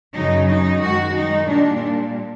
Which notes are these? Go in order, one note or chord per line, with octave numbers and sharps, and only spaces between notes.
F#2 C#3 F#3 D#4
D#4
F#2 D#3 G#3 F#4
D#4
A#2 G3 D4